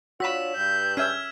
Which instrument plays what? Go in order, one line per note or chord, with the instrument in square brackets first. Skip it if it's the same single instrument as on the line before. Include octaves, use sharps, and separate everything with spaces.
[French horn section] D4 F4 C#5 [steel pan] F#4 B5 [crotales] E6 B6 E7
[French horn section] G2 [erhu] G6
[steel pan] C#4 E5 [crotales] F6 G#6